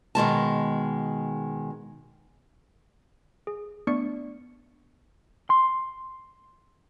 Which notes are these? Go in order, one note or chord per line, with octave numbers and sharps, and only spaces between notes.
B2 D#3 G#3 A5
G#4
A3 B3 D4 D5 C#6 C#7
C6